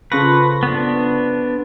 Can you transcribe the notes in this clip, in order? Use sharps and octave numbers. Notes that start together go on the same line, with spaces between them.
C#3 F3 A4 B4 C#6 A#6
B3 D4